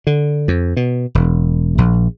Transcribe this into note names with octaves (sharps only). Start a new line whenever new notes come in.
D3
F2
B2
E1
A#1